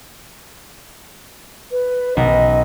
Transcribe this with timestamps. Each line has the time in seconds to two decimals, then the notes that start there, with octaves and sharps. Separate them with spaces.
1.72 B4
2.17 B1 D#5